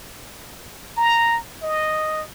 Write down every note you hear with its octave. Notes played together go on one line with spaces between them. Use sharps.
A#5
D#5